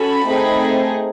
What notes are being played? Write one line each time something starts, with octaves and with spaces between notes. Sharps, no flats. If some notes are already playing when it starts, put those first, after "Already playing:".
Already playing: C#4 F#4 A4 B5
A3 C4 D#4 G#4